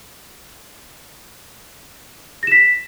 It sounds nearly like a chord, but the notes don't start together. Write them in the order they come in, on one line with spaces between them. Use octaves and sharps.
A#6 E7 B6